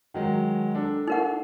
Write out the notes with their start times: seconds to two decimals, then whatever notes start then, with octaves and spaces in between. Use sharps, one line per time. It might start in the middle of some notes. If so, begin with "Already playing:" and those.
0.14 D#3 F#3 G#3
0.75 D4 A4
1.08 D#4 A#4 F#5